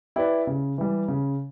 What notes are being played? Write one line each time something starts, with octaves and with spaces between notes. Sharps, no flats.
E4 G4 B4 D5
C#3
E3 G3
C#3